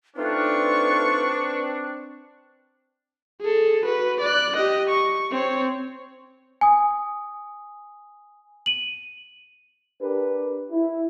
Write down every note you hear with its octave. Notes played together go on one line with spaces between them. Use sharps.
A3 C4 D4 D#4 F4 B4 C#6
G#4 A4
F#4 B4
D5 F#6
G4 D#5
C#6
C4 C#5
G#5 D#6
D#7 F#7
D4 G4 A#4 B4
E4